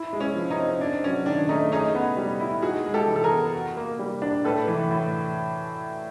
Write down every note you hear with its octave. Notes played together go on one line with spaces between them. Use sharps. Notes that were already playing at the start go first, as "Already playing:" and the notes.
Already playing: E4
G#3
C#4
F3
C#4 D#4
C4
C4 D4
F#3 C#4
D#3 D4
A3 C#4 D#4
C#4 D#4 G#4
B3
G3
E4
D#4 F#4 G#4
G#3
G4 A4
E3
A4
G#4 A#4
B3
F#4
A#3
G3
D4
A2 A4 B4
E3
A2